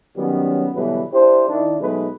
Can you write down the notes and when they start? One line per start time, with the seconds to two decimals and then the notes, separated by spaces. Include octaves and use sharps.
0.16 D#3 F#3 G3 B3 C#4
0.74 B2 D3 E3 F#3 G3 B4
1.12 D4 E4 G4 C5
1.49 D#3 D4 E4
1.80 B2 F#3 G#3 A3 D#4 B4